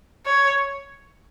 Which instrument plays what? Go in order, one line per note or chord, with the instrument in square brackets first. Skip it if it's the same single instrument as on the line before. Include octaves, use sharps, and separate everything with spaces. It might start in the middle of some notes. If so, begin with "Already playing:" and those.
[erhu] C#5